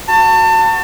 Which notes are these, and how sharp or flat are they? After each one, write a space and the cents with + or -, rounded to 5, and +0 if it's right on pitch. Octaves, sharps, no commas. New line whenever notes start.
F#4 +0 A5 +30